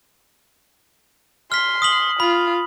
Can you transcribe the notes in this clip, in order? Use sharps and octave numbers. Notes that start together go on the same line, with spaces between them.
C6 F6 B6
D#6 B6 F#7
F4 B5